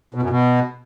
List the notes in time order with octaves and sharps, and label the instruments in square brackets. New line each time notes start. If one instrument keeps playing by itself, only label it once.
[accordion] B2
F#2
B2